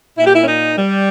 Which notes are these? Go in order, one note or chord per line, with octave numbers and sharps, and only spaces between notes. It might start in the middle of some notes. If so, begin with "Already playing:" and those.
A#2 E4
G4
E4
C#4
D#4
G3